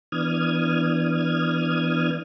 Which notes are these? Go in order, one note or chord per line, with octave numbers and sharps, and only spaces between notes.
E3 B3 D4 D#6 F6 G#6